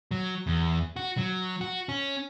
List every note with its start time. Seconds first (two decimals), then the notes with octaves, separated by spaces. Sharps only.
0.11 F#3
0.47 E2
0.96 F#4
1.18 F#3
1.61 F#4
1.89 C#4